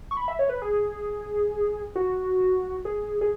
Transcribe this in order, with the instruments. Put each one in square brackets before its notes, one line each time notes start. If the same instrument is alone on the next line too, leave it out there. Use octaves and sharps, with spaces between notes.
[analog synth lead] C#6
B5
E5
C#5
B4
G#4
F#4
G#4
G#4